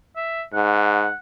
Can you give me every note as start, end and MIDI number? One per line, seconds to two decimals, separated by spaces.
0.16 0.42 76
0.54 1.08 44
0.54 1.16 78